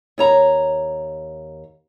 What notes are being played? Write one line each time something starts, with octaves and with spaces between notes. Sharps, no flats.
D#2 C#5 A#5